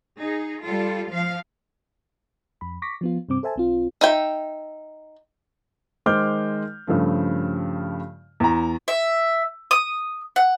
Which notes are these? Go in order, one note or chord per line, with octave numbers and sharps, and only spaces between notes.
D#4 G#4
G3 F4 A4
F3 F5
F2 B5
C#6 D6 A#6 B6
F3 B3 F4
G2 C3 C4 D6
A4 C5 E5 G#5 A5
B1 C4 F4
D#4 E5 G5
D#3 G#3 C5 D6 F6 G6
G2 C#3 F3 A3
E2 A#5
E5
D#6
F#5